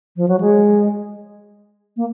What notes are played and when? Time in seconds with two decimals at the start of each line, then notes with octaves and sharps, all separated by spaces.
0.17 F3
0.28 F#3
0.40 G#3
1.97 A#3